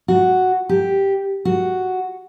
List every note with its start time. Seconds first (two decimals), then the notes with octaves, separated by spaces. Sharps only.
0.08 F#4
0.69 G4
1.45 F#4